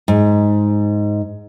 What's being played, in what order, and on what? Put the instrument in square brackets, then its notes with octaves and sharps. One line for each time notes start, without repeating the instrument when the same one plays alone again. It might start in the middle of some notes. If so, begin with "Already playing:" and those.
[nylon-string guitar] G#2